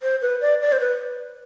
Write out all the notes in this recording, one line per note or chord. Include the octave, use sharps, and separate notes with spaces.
C5
B4
D5
D5
C5
B4